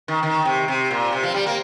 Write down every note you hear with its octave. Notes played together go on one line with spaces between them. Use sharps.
D#3
D#3
C3
C3
A#2
C3
F3
G3
A#3